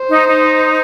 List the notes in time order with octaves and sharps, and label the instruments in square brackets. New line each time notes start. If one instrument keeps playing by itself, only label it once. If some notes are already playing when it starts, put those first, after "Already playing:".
Already playing: [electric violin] C5
[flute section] D#4
D#4